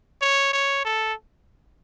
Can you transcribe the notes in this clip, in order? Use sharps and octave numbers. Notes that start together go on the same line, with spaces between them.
C#5
C#5
A4